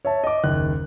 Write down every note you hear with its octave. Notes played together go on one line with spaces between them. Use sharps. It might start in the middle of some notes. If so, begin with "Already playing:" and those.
C#5 E5 A5
D#5 D6
F#1 D#2 F#6